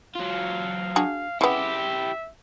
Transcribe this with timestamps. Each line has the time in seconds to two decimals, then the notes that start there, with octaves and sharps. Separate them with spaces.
0.15 F#3 F4 F5
0.96 D4 F#4 G#4
1.41 C#3 B3 E4 G4 E5